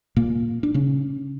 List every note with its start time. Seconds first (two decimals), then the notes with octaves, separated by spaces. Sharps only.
0.17 A#2 A#3
0.63 D4
0.74 C#3 C#4